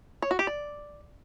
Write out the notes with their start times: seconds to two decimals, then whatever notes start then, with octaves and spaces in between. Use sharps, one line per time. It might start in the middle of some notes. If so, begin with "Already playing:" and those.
0.22 C#5
0.31 F#4
0.39 G4
0.47 D5